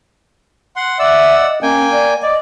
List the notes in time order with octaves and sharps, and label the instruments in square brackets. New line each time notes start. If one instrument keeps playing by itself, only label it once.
[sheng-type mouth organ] F#5 C6
[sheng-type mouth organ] D5 F#5 E6 [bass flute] E5
[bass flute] D#5
[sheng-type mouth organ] A#3 G5 G#5 [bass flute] C#4
[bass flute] D5
[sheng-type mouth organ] D5 [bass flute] D#5